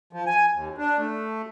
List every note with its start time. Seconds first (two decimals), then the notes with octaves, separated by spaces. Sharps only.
0.13 F3
0.26 G#5
0.53 D#2
0.78 D4
0.98 A3